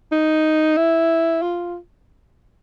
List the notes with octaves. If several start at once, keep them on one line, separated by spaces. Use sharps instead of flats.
D#4
E4
F4